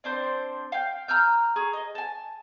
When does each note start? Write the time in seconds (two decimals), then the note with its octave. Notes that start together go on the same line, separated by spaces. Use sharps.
0.04 C4 D4 C5 C6
0.72 F5 G5
1.08 A#5 E6 F6 G6
1.56 G#4 A#5 C#6
1.73 D#5
1.95 G#5 A5